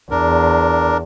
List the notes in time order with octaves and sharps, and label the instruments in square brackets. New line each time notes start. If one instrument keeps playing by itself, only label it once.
[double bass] E2 [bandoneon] D4 A#4